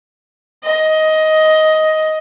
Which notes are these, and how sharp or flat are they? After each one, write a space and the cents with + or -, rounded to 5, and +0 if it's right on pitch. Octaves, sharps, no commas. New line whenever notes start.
D#5 +10